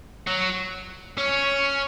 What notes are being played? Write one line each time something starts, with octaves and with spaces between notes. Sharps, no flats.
F#3
C#4